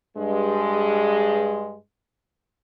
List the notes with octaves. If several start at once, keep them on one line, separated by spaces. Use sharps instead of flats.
G2 G#3